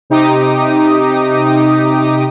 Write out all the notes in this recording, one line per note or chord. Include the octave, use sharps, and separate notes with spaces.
C3 D#4 G4 D6 D#6